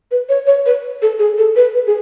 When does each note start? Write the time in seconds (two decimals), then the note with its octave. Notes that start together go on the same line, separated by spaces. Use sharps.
0.11 B4
0.29 C#5
0.47 C#5
0.66 B4
1.02 A4
1.19 G#4
1.38 A4
1.56 B4
1.74 B4
1.86 G#4